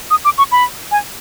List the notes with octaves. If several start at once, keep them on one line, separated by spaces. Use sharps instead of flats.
D#6
D6
C#6
B5
G#5